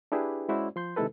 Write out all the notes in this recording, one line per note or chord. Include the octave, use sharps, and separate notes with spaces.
D4 E4 G4 G#4 B4
G#3 C#4 E4 F#4 C5 D5
F3 C6 G6
C3 D#3 G#3 E4 A4 B4